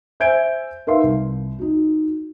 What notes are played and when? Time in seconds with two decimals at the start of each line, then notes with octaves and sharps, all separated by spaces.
0.20 C5 E5 G#5 G6 G#6 D7
0.87 D#4 A#4 B4 E5 F5 C6
1.04 C2
1.59 D#4 F#4